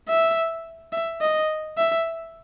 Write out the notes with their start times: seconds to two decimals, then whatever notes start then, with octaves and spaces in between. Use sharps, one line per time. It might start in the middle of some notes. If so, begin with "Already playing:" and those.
0.08 E5
0.92 E5
1.21 D#5
1.78 E5